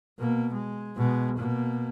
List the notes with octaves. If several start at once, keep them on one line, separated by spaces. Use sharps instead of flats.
B2 A#3
G#3
B2 G#3
B2 A#3